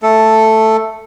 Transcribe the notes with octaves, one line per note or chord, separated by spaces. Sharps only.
A3 A4